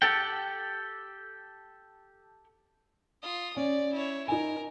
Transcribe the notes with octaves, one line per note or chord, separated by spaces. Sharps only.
G4 A4 F#5 G5
F4 D#6
C#4 D5
E4 C#5
D#4 A#4 G#5